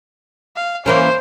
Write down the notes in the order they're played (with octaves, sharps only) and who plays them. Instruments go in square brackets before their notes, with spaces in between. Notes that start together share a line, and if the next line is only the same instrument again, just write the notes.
[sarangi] F5
[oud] E3 A#3 C#4 [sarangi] C5